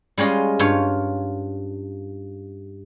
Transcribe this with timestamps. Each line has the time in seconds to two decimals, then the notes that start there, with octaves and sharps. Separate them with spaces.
0.18 G3 G#3 C#4 F4 D#5
0.59 G2 F4 C#5